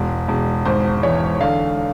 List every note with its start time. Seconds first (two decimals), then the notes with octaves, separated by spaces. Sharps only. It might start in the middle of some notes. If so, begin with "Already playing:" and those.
Already playing: E1 G#3
0.28 E1
0.65 G#1 C5
1.03 E3 C#5
1.41 D3 F5